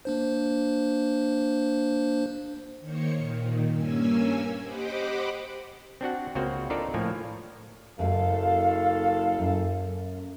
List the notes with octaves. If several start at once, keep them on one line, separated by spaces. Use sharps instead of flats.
A#3 D4 C5
D#3 A#3 C5 C#5 C#7
A#2 D#3
G2 A#3 C#4 G#5 E6
G4 C5 D#5 F#5 B5 D6
C4 D4 F#4 F#5
C#2 C#3 A#3 C4 F#4 C5
D4 D#4 F4 A4 A#4 D5
A2 F3 A#3 G#5
F#1 F#2 G#3 A4 F5
F#2